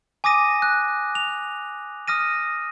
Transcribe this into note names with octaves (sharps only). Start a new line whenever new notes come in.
G#5 D6 D#6 A#6 D#7
F#6
F7
D#6 F6 A#6 D#7